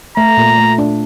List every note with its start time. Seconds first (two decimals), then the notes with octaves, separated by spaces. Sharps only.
0.17 A3 A#5
0.37 A#2
0.58 A3
0.78 D4